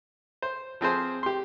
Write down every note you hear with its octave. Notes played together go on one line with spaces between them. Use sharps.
C5
F3 C4 G#4 C5
G4 C6